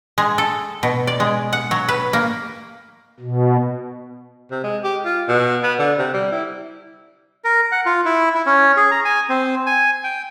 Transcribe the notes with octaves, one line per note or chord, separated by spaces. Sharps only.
G#3
A4
B2
D5
G#3
F#5
F#3
B4
A#3
B2
C3
G#3
G4
F4
B2
B3
D3
C3
G3
E4
A#4
F#5
F4
E4
E4
C#4
G#4
A#5
G#5
C4
G#5
G5